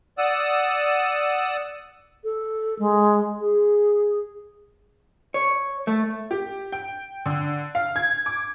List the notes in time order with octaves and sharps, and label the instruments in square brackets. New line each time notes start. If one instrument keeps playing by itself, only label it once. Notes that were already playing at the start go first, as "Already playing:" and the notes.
[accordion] D5 F#5 D#6 E6
[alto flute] A4
G#3
G#4
[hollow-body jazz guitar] C#5
A3
[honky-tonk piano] G4
G5
D3
F5
G#6
D6